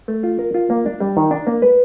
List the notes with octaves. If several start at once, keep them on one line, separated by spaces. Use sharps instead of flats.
A3
F4
A#4
F4
A#3
D4
G3
D#3
D4
A#3
B4